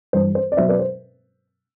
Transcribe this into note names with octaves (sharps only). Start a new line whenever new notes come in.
G2 E3 G3 C5
C5
D5
B2 F#3 C5 E5
B4 D5
C5